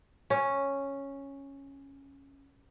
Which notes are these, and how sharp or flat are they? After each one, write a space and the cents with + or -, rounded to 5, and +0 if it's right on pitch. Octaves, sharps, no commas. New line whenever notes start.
C#4 -5